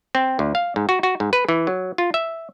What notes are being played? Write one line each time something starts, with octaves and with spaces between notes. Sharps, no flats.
C4
D2
F5
G#2
F#4
F#4
G#2
B4
E3
F#3
F4
E5